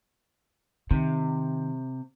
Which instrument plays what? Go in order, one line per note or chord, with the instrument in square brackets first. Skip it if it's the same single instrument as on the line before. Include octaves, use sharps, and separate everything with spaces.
[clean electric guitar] C3 [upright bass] D#3